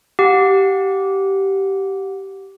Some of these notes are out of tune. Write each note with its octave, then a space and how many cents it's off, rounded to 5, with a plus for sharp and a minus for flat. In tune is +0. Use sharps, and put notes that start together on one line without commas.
G4 -15 F#5 -30